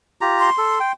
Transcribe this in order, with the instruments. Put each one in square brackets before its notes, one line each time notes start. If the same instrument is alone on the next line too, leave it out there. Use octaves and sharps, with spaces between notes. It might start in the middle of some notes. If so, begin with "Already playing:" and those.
[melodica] F4 G4 A#5
[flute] C6
[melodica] A4
G5